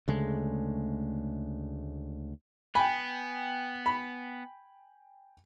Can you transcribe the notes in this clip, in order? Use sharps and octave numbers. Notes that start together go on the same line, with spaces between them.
D2 C#3 G#3 A3
B3 G5 G#5 B5
B5